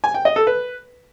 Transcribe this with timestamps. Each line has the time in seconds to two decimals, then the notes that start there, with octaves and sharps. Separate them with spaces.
0.04 G#5
0.14 G5
0.25 D#5
0.36 A4
0.47 B4